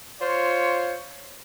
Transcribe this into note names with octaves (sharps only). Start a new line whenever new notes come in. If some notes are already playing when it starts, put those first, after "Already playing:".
F4 C5 C#5